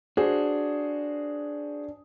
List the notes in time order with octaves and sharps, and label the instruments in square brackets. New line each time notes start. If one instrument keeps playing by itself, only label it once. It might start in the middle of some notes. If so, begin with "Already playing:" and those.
[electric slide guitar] D4 [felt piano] F#4 G#4 C5